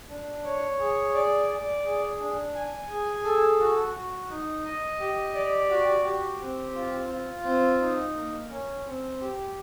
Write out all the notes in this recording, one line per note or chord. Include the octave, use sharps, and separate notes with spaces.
D4
C#5
G#4
D5
D5
G#4
D4
G#5
G#4
A4
F#4
F#4
D#4
D#5
G4
D5
F#4
G4
C4
F4
F4
C4
D#4
A#3
C#4
C4
G4